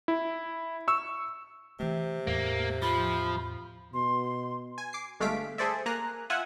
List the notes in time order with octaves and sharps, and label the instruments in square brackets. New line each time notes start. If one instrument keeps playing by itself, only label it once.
[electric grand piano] E4
C#6 E6
[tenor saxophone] C3 [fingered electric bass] E3 A3
[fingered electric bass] E2 A2 [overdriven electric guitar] A#3
[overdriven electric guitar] F3 [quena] B5
[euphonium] B2 [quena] C6
[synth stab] G#5
D6 C7
G1 G#3 A3 F5 B6 D7
G#4 A4 C5 D5 E5
A#3 G#5 A#5 F#6
F4 E5 F#5 G#5